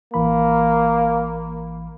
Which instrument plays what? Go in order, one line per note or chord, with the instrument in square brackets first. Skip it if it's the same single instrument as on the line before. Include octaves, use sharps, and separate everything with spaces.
[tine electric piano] A1 E3 B5 [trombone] A#3